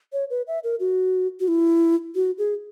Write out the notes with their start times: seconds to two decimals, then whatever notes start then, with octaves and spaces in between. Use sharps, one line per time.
0.13 C#5
0.30 B4
0.47 E5
0.64 A#4
0.80 F#4
1.40 F#4
1.48 E4
2.15 F#4
2.38 G#4